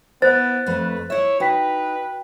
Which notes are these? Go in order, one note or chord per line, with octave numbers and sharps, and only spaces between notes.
B3 E4 C5 F#6 A6
F2 A3 B4
E4 C#5 E5
D#4 F#4 B4 G5 B6